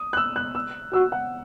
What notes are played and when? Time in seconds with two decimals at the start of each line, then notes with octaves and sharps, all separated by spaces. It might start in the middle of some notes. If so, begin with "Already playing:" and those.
Already playing: D#6
0.13 F#6
0.17 E6
0.36 F#6
0.55 E6
0.93 F#4 E6
1.12 F#5